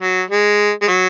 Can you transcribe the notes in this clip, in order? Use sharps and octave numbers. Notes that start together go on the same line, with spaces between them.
F#3
G#3
G#3
F#3